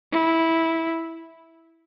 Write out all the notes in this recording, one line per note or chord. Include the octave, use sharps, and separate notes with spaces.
E4